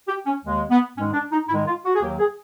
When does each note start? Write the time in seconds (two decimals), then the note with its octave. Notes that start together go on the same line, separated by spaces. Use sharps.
0.08 G4
0.26 C#4
0.44 D#2 D#3 G#3
0.70 B3
0.96 G#2 D#3 G#3 C#4
1.14 D4
1.32 D#4
1.49 G#2 D#3 G#3 E4
1.67 F4
1.84 F#4
1.95 G#4
2.01 D#2 D#3 F#3 G4
2.19 G#4